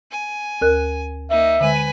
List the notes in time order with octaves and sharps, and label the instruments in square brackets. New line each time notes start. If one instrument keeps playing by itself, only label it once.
[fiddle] G#5
[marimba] D2 A#4 F#6
[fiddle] A#3 D#4 [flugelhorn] E5
[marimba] D3 G#3 [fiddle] B4 G#5